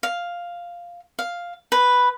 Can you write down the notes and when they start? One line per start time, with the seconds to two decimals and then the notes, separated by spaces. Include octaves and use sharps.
0.03 F5
1.19 F5
1.72 B4